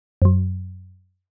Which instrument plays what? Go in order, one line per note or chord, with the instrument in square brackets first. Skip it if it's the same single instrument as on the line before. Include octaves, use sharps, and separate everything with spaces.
[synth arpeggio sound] F#2 F#3